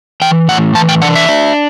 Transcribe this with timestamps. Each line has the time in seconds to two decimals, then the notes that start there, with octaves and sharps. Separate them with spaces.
0.22 E3 G5
0.48 A2 F#5
0.75 E3 A5
0.89 G5
1.02 D4 F#5
1.15 E5
1.29 D4